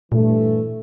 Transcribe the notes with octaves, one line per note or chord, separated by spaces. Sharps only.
G2 A#2 E3 A3